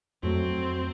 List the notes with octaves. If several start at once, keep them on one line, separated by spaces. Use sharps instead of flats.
F2 F#3 A3 C4